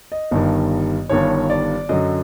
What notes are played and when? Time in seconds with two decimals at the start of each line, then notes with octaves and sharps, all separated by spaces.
0.12 D#5
0.31 G1 G2 D#3
1.09 G1 G2 D#3 C#5
1.50 D5
1.89 F#2 D3 F#3 D#5